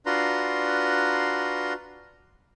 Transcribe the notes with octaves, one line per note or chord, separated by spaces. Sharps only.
D4 F4 F#4 B4 A#5 C6